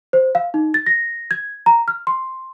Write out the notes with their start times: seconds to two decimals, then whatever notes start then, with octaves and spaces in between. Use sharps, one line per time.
0.13 C5
0.35 F5
0.54 D#4
0.74 A6
0.86 A#6
1.31 G#6
1.66 A#5
1.88 F6
2.07 C6